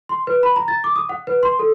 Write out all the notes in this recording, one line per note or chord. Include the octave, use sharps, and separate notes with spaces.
C6
B4
B5
A#5
A6
D6
D#6
F#5
B4
C6
A4